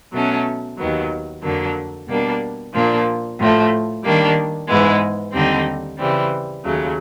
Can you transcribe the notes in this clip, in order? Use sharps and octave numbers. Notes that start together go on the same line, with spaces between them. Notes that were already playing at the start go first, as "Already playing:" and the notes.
B2 F#3 A3 C#4
D#2 D#3 F#3 B3
F2 D3 F#3 A#3 D4
B2 G3 A#3 D4
A#2 F3 A#3 D4
A2 F3 A3
D#3 G3 A#3 D4
G#2 E3 G#3 B3
D#2 D3 G3 C4 D#4
C#3 E3 G3 C4
D#2 C#3 F#3 A3